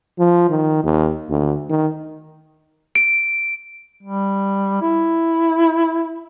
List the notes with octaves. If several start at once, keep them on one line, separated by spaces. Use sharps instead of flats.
F3
D#3
D#2
D2
D#3
D7
G3
E4